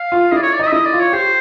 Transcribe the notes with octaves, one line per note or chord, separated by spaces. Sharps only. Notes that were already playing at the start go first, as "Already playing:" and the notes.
Already playing: F5
F4
E4 D5 D#5
C#5
D5
D#4 D#5
E5
E4 D#5
D5
F4
C#5
G4 C5